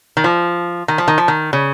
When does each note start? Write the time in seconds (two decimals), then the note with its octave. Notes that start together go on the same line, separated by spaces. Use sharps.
0.17 D#3
0.24 F3
0.88 D#3
0.98 F3
1.08 D#3
1.18 F3
1.28 D#3
1.53 C#3